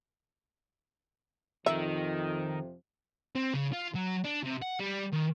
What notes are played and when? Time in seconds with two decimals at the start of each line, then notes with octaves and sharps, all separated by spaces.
1.66 F2 C3 D#3 F3 D#4 E5
3.36 C4
3.54 C#3
3.72 F4
3.95 F#3
4.24 D4
4.44 C3
4.62 F#5
4.80 G3
5.13 D#3